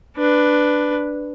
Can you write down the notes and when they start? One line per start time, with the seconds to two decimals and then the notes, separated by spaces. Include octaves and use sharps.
0.17 D4 B4